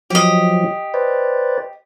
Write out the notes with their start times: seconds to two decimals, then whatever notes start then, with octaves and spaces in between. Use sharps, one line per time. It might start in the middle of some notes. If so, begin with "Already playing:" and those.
0.10 F3 F#3 G4 D#5
0.94 B4 C5 D5